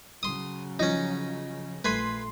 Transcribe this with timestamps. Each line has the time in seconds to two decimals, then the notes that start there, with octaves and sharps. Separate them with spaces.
0.23 C#3 F#3 C6 D#6
0.79 F3 C#4 D#4
1.85 A#1 A3 B4 G#5 B5 C6